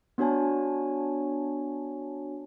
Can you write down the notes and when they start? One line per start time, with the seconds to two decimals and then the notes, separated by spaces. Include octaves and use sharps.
0.18 B3 D4 F#4 C#5 G#5 A5